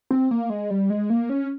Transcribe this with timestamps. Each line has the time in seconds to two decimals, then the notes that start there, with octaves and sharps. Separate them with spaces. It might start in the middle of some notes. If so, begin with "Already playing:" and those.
0.11 C4
0.31 A#3
0.50 G#3
0.70 G3
0.90 G#3
1.10 A#3
1.29 C#4